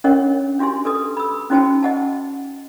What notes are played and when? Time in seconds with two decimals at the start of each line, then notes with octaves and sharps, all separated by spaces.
0.04 C#4 D4 A#4 C#5 D#5 F#5
0.59 D4 F#4 G4 G#5 C6
0.85 A4 B4 D#6
1.17 B5 E6
1.50 C#4 D#4 F#4 C5 G5 A5
1.83 D#5 F#5 A5